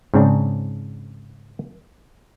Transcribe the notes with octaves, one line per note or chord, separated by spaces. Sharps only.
G#2 C#3 C4 D4